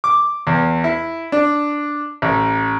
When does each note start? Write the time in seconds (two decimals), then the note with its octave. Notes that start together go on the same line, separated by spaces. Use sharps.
0.04 D6
0.47 E2
0.84 E4
1.32 D4
2.22 A1